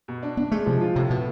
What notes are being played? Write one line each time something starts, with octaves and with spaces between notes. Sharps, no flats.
B2
D4
B3 D4
G#3 A3
C3 F3
F4
A2 C3
B2 B3